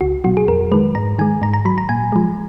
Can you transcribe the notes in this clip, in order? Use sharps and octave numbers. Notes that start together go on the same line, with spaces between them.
C#2 F#4
B2 F#3 F#4
G#4
F2 A#4
D#3 G#3 B4
G#2 A#5
D#3 G#3 G#5
G#2 A#5
A#5
F#3 B5
A#5
A#2 G#5
F3 G#3